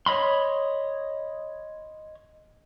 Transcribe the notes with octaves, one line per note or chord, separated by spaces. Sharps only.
C#5 D#5 B5 C6